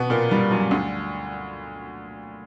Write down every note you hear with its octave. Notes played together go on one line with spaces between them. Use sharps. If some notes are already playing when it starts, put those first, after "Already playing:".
Already playing: B2 B3
A#2 A#3
G2 G3
F#2 F#3
D2 D3